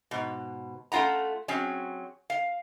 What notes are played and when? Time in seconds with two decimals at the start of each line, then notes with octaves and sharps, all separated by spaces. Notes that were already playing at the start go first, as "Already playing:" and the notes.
0.11 G#2 B2
0.92 A3 C#4 F4 F#5 A#5
1.48 F#3 C4 C#4 G#4
2.30 F5